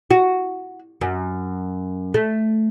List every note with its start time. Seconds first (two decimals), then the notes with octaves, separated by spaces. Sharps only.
0.11 F#4
1.01 F#2
2.14 A3